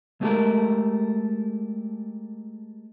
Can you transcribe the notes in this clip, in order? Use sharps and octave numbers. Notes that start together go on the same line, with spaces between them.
G#3 A3 B3 G4 A4 A#4